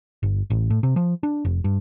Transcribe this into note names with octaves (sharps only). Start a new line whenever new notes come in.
G1
A1
A2
C3
F3
D4
F1
G2